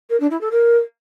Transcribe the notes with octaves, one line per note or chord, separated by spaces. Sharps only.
A#4
D4
E4
A4
A#4